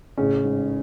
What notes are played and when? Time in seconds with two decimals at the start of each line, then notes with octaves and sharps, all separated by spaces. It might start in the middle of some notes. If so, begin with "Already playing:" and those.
0.18 A1 C#3 C#4
0.44 G#2